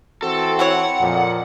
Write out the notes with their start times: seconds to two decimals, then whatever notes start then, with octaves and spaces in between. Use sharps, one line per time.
0.23 E3 C4 F#4 A4
0.59 E4 A4 C#5 F#5
1.00 F2 A#2